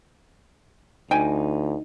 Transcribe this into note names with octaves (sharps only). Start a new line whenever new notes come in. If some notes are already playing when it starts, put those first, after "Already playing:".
D2 D#4 G5 G#5